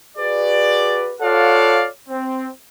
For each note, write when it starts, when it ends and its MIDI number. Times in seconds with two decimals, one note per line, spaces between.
0.18 1.13 66
0.18 1.13 68
0.18 1.13 71
0.18 1.13 74
1.22 1.87 65
1.22 1.87 69
1.22 1.87 73
1.22 1.87 74
1.22 1.87 77
1.22 1.87 78
2.09 2.47 60